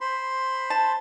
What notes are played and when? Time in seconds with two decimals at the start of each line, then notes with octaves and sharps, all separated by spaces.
0.01 C5 B5 C6
0.70 A5